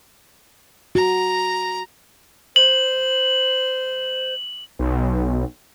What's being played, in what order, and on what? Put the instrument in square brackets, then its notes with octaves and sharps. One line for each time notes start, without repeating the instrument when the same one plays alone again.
[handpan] F#4 [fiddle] A#5
[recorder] C5 [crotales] F#7
[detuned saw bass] B1